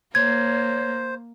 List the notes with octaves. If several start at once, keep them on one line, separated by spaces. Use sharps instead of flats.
A#3 C5 C#5 G#6